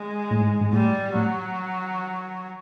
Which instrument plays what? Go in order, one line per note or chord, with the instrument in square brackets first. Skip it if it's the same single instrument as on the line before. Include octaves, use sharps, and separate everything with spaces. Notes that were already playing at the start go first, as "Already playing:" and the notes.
Already playing: [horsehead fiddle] G#3
[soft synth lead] A2
G#2
G#2
[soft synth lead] A2 [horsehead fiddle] G3
[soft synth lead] A2 [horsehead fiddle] F#3